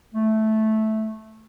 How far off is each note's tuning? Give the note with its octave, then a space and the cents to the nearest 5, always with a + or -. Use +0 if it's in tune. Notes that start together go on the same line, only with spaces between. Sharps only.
A3 -10